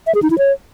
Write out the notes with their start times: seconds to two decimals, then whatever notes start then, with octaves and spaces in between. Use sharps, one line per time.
0.07 E5
0.15 G#4
0.23 D#4
0.30 E4
0.38 C#5